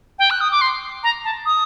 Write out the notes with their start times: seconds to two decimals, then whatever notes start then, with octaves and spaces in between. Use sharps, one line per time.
0.19 G5
0.31 F#6
0.41 D#6
0.51 D6
0.61 C6
1.03 A#5
1.24 A5
1.46 D#6